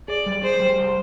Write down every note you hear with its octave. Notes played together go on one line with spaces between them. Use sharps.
G#4 D5
G3
G#4 C5
G3
C5